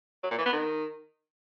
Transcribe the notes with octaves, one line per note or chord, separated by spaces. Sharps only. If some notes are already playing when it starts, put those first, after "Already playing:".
F#3
A#2
E3
B3
D#3